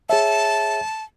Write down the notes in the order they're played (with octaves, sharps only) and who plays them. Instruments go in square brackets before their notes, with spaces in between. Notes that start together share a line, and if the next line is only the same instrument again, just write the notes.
[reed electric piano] G#4 C#5 E5 [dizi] A5